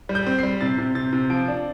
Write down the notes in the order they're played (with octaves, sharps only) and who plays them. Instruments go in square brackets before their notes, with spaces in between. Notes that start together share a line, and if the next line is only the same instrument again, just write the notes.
[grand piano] G3
G6
C4
C7
G3
C3 A6
C3
C3 A6
C3
F3 D7
D4